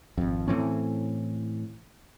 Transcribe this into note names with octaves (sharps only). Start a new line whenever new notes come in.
G#1 F2
A2 E3 C4 C#4